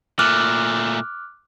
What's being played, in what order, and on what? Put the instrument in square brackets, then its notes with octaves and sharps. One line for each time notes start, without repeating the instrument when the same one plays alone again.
[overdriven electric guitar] A#2 A3 [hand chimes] D6 F6 F#6